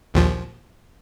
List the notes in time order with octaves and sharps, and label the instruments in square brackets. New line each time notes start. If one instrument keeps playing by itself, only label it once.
[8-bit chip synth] A#1 D#2 F3